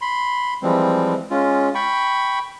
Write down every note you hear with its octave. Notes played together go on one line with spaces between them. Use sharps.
B5 C6
E3 F3 G3 G#3 C4
G#3 C#4 F4
G5 B5 C#6